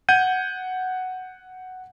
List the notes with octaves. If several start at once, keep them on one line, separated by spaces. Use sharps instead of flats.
F#5 G6 G#6 D#7